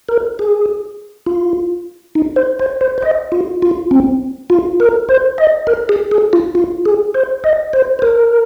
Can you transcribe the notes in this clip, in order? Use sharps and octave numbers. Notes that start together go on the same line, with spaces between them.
A#4
G#4
F4
D#4
C5
C5
C5
C5
D#5
F4
F4
C4
F4
A#4
C5
D#5
A#4
G#4
G#4
F4
F4
G#4
C5
D#5
C5
C5
A#4